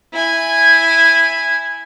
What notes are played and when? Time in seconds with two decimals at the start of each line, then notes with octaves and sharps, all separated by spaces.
0.13 E4 G#5